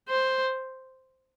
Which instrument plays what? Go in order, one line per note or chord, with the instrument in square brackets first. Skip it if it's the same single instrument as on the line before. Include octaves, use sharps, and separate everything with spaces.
[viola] C5